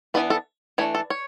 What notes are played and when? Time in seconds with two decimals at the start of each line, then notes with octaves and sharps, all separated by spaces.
0.14 E3 B3 D4 B4
0.30 A4
0.78 E3 A3 D4 C#5
0.95 A4
1.10 C#5